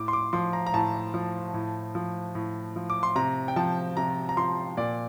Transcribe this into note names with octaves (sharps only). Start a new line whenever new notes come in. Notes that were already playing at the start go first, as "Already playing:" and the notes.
Already playing: A2 D6
C6
D6
F3 C6
A#5
A#5
A2 A5
F3
A2
F3
A2
F3
D6
C6
C3 A#5
G5
F3 A5
C3 A#5
A#5
F3 C6
A#2 D5